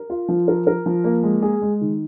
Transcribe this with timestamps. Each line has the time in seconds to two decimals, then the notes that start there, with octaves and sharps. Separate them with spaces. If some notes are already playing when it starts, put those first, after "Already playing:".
Already playing: A#4
0.10 F4
0.28 F3
0.48 A#4
0.67 A#4
0.86 F3
1.04 A#3
1.23 G#3
1.42 G#4
1.62 G#3
1.81 D#3